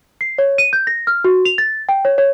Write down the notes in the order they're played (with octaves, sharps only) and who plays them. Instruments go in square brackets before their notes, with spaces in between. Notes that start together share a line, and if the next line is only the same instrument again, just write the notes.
[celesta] C7
C#5
D#7
G6
A#6
F6
F#4
F7
A6
G5
C#5
C#5